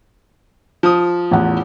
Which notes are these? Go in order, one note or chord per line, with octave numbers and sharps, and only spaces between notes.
F3 D#6
A1 E2 F#5